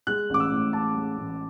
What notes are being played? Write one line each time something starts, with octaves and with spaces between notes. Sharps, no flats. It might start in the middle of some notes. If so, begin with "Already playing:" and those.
G#3 F#6
A1 D6
E6
A2
A1 A5
G#3
A1